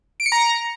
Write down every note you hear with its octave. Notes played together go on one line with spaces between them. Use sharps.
D7
C#7
A#5